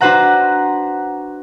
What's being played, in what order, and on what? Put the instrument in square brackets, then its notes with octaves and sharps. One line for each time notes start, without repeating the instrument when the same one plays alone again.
[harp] D4 F#4 B4 C5 F#5 A#5